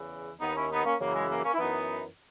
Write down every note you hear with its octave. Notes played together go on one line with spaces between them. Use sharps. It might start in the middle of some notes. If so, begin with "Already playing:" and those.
Already playing: E2 C#3 E3
D#2 D#3 B3 D#4
C#4 E4
B3 D#4
A#3 C#4
F#2 C#3 E3 A#3
G#3
A#3
A#3 C#4
E4
F#2 E3 B3 D#4